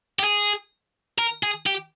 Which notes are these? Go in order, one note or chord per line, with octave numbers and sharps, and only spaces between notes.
G4
G#4
A#4
G#4
G4